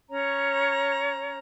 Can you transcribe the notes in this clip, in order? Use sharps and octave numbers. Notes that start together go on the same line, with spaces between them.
C#4 C#5 A#5